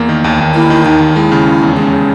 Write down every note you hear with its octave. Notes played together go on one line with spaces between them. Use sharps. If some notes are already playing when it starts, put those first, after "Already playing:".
Already playing: E2 A#3
D#3
D#2
D#2
A#3 E4
D#3
D#2 D#4
D#2
G#3 E4
C#3
C#4
E2
G#3 C#4
C#3